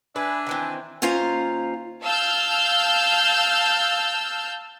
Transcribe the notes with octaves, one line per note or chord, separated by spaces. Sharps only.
D4 B4 E5 G#5
D#3 E3 C4
D#2 C#4 F4 C5 F5 A#5
F5 A5 E6 F6 G6